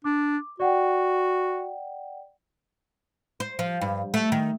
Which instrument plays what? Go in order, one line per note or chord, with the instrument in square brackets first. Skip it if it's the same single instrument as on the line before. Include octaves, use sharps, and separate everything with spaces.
[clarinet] D4 [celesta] D6
[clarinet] F#4 [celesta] D5 F#5 G5
[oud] C5
F3
G2
A3
D#3